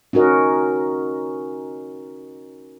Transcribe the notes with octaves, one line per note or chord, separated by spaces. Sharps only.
C#4 D#4 F#4 A#4 D#5